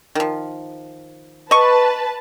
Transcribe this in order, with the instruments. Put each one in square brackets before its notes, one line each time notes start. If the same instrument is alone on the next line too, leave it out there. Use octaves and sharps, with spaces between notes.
[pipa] D#3 F3
[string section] B4 A5 [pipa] D#5 C#6